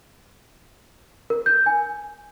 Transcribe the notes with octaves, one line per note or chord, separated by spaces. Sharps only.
A#4
G6
G#5